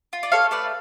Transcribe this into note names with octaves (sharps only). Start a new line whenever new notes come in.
F4
D5
A4 C#5 F5
A3 B4 D5